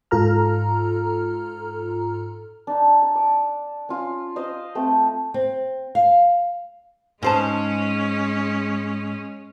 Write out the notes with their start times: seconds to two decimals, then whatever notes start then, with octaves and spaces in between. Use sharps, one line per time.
0.11 G#2 F4 A4 A#5 F6
2.67 D4 D#4
3.03 A5
3.16 D6
3.89 C#4 F4
4.36 C5 D#5 F5
4.75 A3 C4
5.34 C4
5.95 F5
7.23 G#2 G#3 C#4 C5 A5